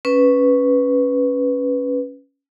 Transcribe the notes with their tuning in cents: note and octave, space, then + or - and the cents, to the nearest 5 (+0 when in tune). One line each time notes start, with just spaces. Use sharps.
C#4 +0 B4 +0